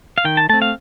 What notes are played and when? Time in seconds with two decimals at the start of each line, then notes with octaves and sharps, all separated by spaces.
0.18 F5
0.25 D#3 G5
0.37 A5
0.49 A3 C4 A5
0.62 F5